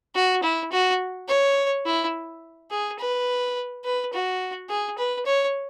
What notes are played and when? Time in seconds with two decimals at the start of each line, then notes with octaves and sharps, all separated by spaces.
0.15 F#4
0.43 E4
0.72 F#4
1.28 C#5
1.85 E4
2.71 G#4
2.99 B4
3.85 B4
4.13 F#4
4.69 G#4
4.98 B4
5.26 C#5